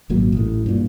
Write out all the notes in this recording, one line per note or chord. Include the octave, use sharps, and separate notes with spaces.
G#1 A#2 F#3
A1 A2
G2 A#2